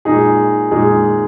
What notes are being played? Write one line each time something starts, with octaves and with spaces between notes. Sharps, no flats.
A#2 G#3 D#4 G#4
A#2 G#3 D#4 G#4